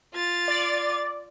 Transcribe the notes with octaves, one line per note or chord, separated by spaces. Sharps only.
F4 A6
D5